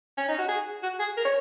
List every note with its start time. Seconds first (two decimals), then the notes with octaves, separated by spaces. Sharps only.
0.17 C#4
0.28 D#4
0.38 F#4
0.48 G#4
0.83 F#4
0.99 G#4
1.17 A#4
1.25 C#5